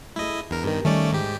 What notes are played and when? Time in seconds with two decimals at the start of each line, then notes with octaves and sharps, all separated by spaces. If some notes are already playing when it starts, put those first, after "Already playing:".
0.16 A3 E4 G#4 A4 D#5
0.51 E2 D4 A#4
0.64 G2 D#3 B3 G4 A#4
0.85 D#3 G3 A3 C#4 D#4 D5 G#5
1.12 G#2 D#4 G4